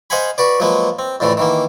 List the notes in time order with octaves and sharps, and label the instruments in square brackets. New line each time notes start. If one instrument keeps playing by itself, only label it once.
[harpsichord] C5 D#5 F5 F#5 G#5 B5
F#4 B4 D5
F3 F#3 G#3 A#3 B3
C4
F2 A2 D3 E3 A3
D#3 E3 A#3